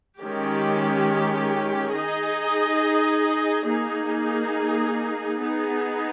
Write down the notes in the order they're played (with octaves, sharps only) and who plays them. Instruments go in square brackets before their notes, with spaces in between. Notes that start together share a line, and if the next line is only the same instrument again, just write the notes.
[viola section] D#3 G#3 C#4 G4
D#4 G#4 D#5
A#3 D#4 G#4
B3 D#4 G#4